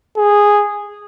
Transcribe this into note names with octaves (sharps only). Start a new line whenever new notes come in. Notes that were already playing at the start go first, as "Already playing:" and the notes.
G#4